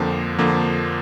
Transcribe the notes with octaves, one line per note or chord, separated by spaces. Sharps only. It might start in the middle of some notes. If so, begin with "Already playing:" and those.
Already playing: F2 D3 F3 A#3
F2 D3 F3 A#3